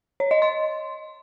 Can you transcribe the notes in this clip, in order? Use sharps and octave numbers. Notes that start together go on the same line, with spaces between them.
C#5
D#5
C6